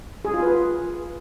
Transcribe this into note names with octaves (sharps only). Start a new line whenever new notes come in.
G#4
F4
B4